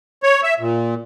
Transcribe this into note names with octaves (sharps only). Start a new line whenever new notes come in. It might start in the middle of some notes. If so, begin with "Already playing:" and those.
C#5
E5
A#2